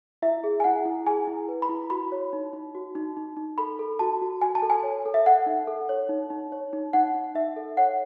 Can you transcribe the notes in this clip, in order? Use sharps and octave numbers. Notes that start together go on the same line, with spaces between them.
E4 E5
G#4
G#5
E4 F#5
E4
G#4 G#5
E4
B4
B5
E4
F#4 B5
C#5
D#4
D#4
F#4
D#4
D#4
D#4
A4 B5
A4
F#4 A5
F#4
F#4 G#5
A5
A4
G#5
C#5
A4
E5
A4 F#5
D#4
A4
C#5
D#4
D#4
C#5
D#4
D#4 F#5
D#4
D#4 E5
A4
C#5 F#5